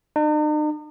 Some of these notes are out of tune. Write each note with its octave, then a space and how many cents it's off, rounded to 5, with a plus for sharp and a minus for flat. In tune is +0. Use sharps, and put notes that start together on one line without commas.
D#4 -45